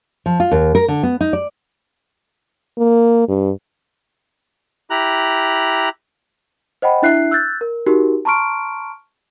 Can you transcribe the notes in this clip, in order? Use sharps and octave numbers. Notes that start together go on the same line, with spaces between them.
F3
F4
D#2
A#4
D3
B3
D#4
D5
A#3
G2
E4 G4 A#5 F#6
C5 D#5 F#5 G5 B5
D4 E4 E5 F#6 C7
E6 F#6 G6 A6
A#4
D#4 F#4 G4 A#4
A5 A#5 C6 C#6 F6 D7